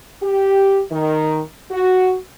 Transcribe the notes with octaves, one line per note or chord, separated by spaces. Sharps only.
G4
D#3
F#4